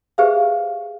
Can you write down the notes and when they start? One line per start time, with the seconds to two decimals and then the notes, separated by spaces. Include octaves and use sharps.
0.18 G4 G#4 B4 C5 E5 F5